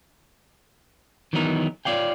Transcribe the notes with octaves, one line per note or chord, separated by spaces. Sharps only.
D#3 E3 F#3 B3 D#4 A#4
F4 C#5 D5 F5 G5